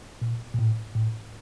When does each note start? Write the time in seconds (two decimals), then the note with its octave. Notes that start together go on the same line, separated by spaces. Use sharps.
0.22 A#2
0.54 A#2
0.59 A2
0.95 A2